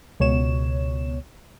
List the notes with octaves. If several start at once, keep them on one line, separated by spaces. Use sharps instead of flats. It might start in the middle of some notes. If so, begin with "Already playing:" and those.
C#2 B2 C#5 E7